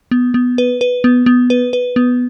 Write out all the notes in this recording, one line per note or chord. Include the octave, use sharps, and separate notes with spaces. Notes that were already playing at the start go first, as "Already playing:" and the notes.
B3
B3
B4
B4
B3
B3
B4
B4
B3